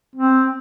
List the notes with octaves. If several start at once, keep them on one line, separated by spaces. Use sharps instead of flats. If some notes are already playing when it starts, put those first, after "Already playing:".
C4